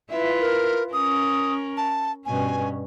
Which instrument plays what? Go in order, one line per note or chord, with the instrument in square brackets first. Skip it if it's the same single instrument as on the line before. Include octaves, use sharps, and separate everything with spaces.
[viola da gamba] E4 F4 B4 [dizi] E5
[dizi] A#4
[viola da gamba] C#4 A#4 [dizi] D#6
[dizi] A5
[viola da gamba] G2 B2 C#4 [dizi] G#5